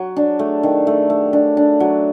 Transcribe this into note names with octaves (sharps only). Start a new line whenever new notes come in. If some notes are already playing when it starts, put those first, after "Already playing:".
Already playing: F#3
D4
A3
D#3
A3
A3
D4
D4
F#3